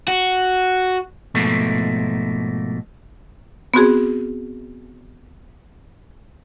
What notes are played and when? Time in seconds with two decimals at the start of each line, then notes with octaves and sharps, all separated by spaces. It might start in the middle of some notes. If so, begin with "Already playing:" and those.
0.08 F#4
1.35 G#2 B2 F3 A3 A#3
3.74 B3 C4 F#4 G#4